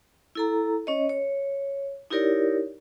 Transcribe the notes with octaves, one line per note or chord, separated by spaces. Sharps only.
E4 A4 A#5
C#4 C#5 D#5
C#5
D#4 E4 G4 A#4 C#5 D5